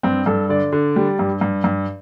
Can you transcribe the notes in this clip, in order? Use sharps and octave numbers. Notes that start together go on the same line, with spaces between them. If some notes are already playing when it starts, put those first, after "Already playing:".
G2 C4
G2 A4
D3 D5
D3
G3
G2
G2
G2